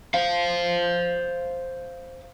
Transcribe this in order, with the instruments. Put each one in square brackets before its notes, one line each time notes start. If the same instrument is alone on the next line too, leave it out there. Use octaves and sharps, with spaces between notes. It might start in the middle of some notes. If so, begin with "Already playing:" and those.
[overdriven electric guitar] C5 F5